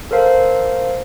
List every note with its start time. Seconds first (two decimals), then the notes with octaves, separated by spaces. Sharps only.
0.11 A4 A#4 C5 F5